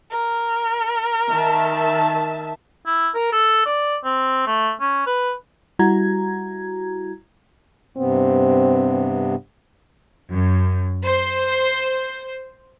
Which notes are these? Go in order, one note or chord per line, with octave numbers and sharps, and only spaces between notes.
A#4
D#3 E5 A5
E4
A#4
A4
D5
C4
A3
C#4
B4
G3 E4 F#4 A#5 G#6
G2 C3 B3 C4
F#2
C5